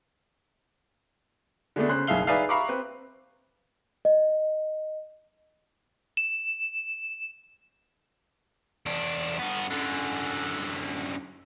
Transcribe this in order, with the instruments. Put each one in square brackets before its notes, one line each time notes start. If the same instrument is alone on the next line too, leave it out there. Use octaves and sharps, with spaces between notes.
[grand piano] D3 G#3 A3 B3 D4
C#3 C5 F#6
F#1 B1 G#4 E5 F5 G7
D#4 G#4 B4 D5 E5 F5
E5 F5 A#5 B5 C#6 D6
C4 B4
[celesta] D#5
[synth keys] E7
[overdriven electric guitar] E2 D4
G2 B3
F#2 D3